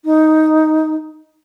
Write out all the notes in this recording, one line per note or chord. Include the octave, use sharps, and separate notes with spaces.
D#4